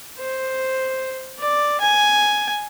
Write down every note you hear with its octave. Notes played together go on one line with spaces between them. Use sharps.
C5
D5
G#5